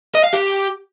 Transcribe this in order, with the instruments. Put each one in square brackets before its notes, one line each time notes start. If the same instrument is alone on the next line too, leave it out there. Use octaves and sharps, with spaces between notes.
[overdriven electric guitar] D#5
F5
G4